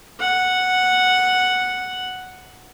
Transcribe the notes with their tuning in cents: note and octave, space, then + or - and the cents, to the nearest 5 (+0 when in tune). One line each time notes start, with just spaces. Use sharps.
F#5 -5